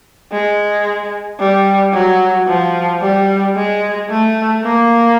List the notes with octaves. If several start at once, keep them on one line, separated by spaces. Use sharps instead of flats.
G#3
G3
F#3
F3
G3
G#3
A3
A#3